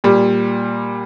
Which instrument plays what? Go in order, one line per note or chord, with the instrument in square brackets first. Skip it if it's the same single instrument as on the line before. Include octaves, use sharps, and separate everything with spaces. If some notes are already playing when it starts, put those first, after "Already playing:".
[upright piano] A#2 G3